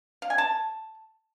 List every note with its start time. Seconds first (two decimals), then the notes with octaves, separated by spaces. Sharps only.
0.22 F5
0.30 G#5
0.38 A5